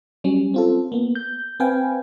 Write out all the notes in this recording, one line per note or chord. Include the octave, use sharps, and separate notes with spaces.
F#3 G3 C#4
C4 F4 A4
A#3 B3
G6
C4 B4 F5 G5 G#5